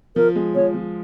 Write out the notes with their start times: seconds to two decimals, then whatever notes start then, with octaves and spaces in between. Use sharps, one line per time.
0.16 F3 A#4
0.36 G#3
0.55 F3 C#5
0.74 F3